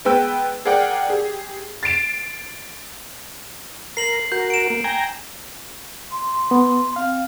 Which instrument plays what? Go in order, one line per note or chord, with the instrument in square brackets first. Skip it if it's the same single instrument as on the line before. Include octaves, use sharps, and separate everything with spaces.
[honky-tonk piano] G#3 B3 B4 G5 E6
G#4 A#4 D5 F#5 G5
G4 G#4
A6 C7 D7 E7
[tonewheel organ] A#4 [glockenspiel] C7 F#7
[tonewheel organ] F#4 A#4 [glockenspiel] G6
[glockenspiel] D7 E7
[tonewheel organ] A#3
G5 G#5 A#5
[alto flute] C6
[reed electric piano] B3
[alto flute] C4 [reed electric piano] F5